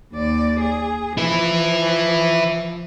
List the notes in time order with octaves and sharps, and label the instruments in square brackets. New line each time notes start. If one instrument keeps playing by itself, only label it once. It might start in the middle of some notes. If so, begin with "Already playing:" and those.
[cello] D#2 D5
G#4
[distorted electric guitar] E3 E4 [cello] F3